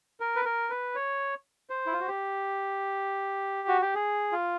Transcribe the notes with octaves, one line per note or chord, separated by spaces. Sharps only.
A#4
B4
A#4
B4
C#5
C5
E4
F4
F#4
G4
F#4
G4
G#4
F4